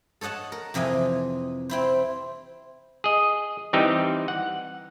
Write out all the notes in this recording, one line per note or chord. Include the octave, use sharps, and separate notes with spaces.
A4 C#5 D#5 F#5 A5
A#4
F2 C3 E3 D#5 G#5
C4 E4 C5
G#4 D#5
E3 G3 C4 D#4 G4
F#5